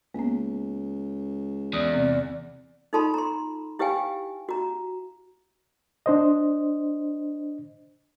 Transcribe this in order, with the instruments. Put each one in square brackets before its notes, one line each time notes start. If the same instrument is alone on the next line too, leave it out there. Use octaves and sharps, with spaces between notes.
[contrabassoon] C#2 [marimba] A#3 B3
[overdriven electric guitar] E2 [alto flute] D5 [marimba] D#6
[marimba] C3 E3 C4
[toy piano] D#4 F4 A4 A5 B5 C6
A#5 C6
E4 G4 B4 F5 G5 G#5
F#4 A#5
[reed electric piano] D4 C5 D#5